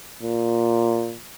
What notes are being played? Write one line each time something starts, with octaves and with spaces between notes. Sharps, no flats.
A#2